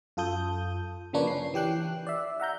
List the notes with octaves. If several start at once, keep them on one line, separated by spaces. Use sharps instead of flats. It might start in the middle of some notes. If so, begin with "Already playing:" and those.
F#2 F4 A4 D#6 G6
C#3 F3 A#3 D4 B4 C#5
C#4 C7
E3 G4 G5 F#6 C7
D5 E5
E5 F#5 A#5 G6